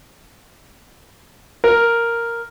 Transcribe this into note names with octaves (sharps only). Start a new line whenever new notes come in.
A#4